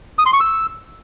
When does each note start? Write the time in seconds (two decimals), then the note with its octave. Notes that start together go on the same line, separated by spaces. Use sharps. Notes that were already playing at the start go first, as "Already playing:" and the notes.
0.19 D#6
0.26 C6
0.33 C#6
0.40 E6